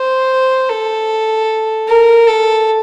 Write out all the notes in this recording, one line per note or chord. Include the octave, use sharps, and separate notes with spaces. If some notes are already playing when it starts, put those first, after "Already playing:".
Already playing: C5
A4
A#4
A4